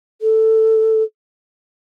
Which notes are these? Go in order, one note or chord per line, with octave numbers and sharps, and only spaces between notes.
A4